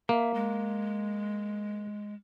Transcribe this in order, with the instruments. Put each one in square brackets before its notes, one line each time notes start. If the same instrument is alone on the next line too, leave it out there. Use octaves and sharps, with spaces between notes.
[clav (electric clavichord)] A#3 [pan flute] E5
[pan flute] G#3